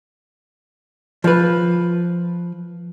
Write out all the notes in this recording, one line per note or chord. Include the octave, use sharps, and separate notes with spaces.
F3 B4